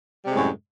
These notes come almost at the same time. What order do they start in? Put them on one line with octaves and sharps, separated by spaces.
G3 C3 G#3 A2 F#2